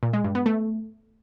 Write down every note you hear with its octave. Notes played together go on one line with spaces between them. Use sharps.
A#2
G#3
G2
B3
A3